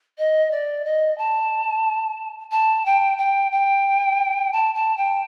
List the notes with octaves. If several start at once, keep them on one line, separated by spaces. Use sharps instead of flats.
D#5
D5
D#5
A5
A5
G5
G5
G5
A5
A5
G5